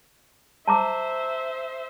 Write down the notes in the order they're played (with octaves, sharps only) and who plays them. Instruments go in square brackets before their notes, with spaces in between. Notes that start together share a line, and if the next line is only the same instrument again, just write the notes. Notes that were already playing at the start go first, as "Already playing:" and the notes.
[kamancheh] C5 E5 [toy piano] A5 A#5 D6